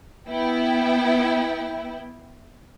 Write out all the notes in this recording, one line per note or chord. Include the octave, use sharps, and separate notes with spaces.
B3 E4 G5